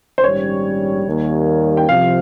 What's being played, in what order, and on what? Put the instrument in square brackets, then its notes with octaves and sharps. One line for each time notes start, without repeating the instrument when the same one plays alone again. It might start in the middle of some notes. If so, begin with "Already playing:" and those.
[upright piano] C5
[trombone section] A#1 G#2 D#3 G3 C#4 [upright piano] C#5
[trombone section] D#2 D#3 G3 A#3
[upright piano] G5
[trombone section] C2 C3 F3 [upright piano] F5